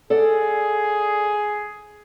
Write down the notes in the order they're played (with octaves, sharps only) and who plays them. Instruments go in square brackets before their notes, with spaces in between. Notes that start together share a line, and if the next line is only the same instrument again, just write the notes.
[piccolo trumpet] G#4 [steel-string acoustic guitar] A4 D5 F#5